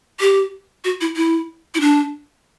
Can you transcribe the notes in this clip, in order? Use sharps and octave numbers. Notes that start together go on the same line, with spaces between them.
G4
F#4
E4
E4
E4
D4